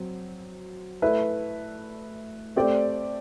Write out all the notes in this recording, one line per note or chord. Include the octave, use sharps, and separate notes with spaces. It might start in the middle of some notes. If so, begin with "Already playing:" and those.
Already playing: F#3 C4
A3 E4 B4 E5
A3 C4 G4 D5